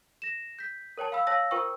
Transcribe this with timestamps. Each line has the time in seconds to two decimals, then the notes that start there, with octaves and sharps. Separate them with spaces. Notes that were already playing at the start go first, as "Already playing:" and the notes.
0.22 A#6 E7
0.59 G6 B6
0.97 A#4 C#5 G5 A5
1.12 F5 G5 B5 E6
1.27 C#5 F5 A5 E6 A#6
1.51 F4 A#4 C5 G5 C#6 E6